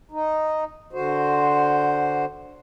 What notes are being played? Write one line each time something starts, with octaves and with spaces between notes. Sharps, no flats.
D#4
D3 F#4 C5